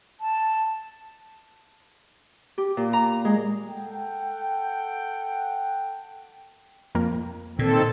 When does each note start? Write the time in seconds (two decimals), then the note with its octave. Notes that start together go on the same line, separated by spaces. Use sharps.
0.21 A5
2.58 G4
2.77 A#2
2.93 A#5
3.25 G#3
3.69 A4 F#5 G5
6.95 F2 A#3
7.59 A#2 D#3 C4 A4